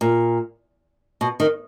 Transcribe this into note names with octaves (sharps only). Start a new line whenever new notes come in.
A#2
B2
D#3